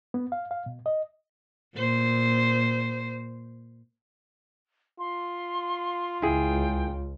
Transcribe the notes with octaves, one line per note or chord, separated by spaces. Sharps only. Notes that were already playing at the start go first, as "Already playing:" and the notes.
B3
F5
F5
B2
D#5
A#2 C5
F4 C6
C#2 E4 G#4 G5